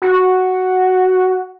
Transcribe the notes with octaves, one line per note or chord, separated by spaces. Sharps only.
F#4